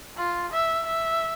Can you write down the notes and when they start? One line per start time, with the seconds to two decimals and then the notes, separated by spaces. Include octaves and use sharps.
0.17 F4
0.52 E5
0.85 E5